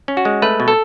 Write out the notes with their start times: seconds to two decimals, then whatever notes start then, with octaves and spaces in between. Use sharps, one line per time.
0.08 C#4
0.17 F#4
0.25 G#3
0.42 A3 B4
0.60 B2
0.68 A4